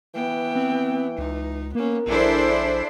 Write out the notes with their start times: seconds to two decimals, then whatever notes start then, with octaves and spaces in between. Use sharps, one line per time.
0.15 E3 B3 G5
0.56 C4
1.18 C#2 D#4
1.75 A#3 B3 C#4 A#4
2.08 A#1 D4 E4 G#4 A4 C5